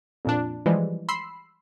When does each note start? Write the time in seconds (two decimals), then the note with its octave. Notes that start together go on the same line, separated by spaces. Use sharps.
0.25 F2 A#2 D4
0.66 E3 F3 G3 G#3
1.09 B5 C6 E6 C7